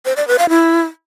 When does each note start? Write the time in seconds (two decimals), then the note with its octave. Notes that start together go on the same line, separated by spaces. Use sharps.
0.05 C5
0.16 D5
0.28 B4
0.39 F5
0.50 E4